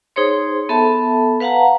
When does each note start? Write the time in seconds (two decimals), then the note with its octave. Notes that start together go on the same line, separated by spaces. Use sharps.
0.16 D#4 G#4 C5 C#5 C6
0.69 B3 A4 E5 A5
1.40 B4 F5 F#5 A5 A#5